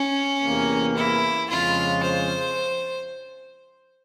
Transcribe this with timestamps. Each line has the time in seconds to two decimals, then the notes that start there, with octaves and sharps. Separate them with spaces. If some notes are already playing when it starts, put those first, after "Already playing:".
Already playing: C#4
0.43 E2 C3 E3 A#3
0.97 E4
1.49 F2 C#3 F3 G#3 C#4 F4
2.04 C5